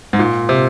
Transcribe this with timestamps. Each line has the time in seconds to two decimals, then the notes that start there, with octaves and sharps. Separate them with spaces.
0.13 G#2
0.19 A#2
0.49 C3